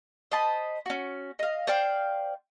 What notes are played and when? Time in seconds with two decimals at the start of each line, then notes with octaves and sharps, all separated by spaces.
0.32 C5 D#5 A5 B5
0.86 C#4 F#4
1.39 D#5 F5
1.67 C5 D5 F5 G5